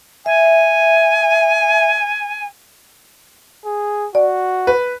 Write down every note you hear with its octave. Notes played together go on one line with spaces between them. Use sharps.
E5 G#5
G#4
F#4 D5
B4